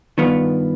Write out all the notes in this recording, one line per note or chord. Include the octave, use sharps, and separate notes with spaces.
G2 D#3 B3 F4